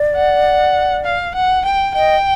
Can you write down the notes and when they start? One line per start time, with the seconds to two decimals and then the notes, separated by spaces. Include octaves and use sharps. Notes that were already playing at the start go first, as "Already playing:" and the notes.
Already playing: D5
0.15 F#5
1.05 F5
1.35 F#5
1.65 G5
1.94 D#5 G5